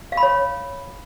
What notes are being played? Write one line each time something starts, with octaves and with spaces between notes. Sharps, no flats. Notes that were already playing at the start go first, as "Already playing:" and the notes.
F5
B5
C#5